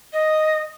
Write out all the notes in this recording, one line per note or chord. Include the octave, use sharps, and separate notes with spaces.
D#5